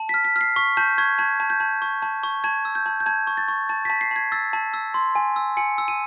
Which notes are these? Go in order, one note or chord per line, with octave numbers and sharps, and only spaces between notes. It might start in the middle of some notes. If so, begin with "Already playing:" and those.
Already playing: A5
B6
F6
B6
F6
C7
C#6 B6
A5 G6
C#6 G#6
A5 G#6
A5
G6
A5
C#6
A5
C#6
A5 G#6
E6
G6
A5
G6
A5 G#6
C#6
A6
C#6
A5 A6
B6
A5
C7
A5 G#6
E6 A6
A5
E6
C6
G#5
E6
G#5 C#7
E6
D#7